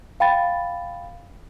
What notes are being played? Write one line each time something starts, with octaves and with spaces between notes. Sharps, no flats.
F5 G5 B5 A6